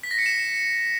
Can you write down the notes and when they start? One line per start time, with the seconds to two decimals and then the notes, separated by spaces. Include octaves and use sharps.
0.03 B6
0.11 A#6
0.18 C#7
0.26 E7